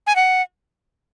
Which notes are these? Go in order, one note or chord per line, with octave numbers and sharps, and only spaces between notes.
G#5
F#5